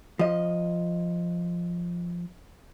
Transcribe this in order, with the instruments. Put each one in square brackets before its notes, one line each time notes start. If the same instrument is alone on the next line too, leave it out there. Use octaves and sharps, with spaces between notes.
[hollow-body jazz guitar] F3 D#5